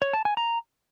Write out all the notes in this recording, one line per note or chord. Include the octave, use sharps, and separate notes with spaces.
C#5
A5
G#5
A#5